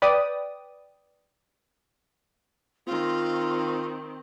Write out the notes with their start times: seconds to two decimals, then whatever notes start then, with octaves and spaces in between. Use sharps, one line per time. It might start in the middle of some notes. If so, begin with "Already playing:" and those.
0.02 B4 D5 G5 D#6
2.87 D#3 C4 F4